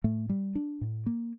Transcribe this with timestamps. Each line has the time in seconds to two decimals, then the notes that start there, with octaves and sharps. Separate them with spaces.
0.04 A2 A3
0.29 G3
0.55 D4
0.81 A2
1.06 A#3